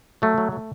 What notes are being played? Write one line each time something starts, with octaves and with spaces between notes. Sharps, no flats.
F#3 A3
F#3
A3